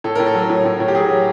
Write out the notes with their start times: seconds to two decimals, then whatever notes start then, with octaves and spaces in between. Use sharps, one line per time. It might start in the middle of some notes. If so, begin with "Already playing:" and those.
0.04 A2 A4
0.15 A2 A#4
0.26 A4
0.35 F#3
0.50 A2
0.65 A2
0.80 A2
0.88 G4
0.95 F#3 G#4
1.11 F#3